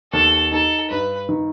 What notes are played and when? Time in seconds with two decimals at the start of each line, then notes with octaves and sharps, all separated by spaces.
0.13 D#2 A4
0.52 D#4 A4
0.90 G2 B4
1.29 D#3